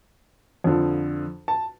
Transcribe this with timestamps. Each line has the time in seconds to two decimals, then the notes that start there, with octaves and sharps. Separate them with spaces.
0.64 F2 D3 F3
1.48 A5